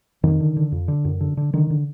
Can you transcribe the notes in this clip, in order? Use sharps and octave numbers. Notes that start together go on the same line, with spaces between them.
F2 D#3
D3
D3
F2
D3
F#2
D3
D3
D3 D#3
D3